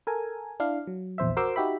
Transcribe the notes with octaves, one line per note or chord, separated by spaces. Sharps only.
A4 A#4 G#5
D4 E4 F5
F#3
A#1 E2 C5 E5
F#4 A#4 C5 C6 D6 E6
D#4 F#4 G4 E5 B5